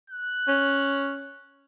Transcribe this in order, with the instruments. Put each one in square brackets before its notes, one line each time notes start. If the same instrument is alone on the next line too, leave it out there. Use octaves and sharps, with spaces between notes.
[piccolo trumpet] F#6
[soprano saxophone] C#4